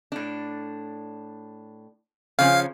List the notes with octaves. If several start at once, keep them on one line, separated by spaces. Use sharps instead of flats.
A2 D4
C#3 F3 C#4 F5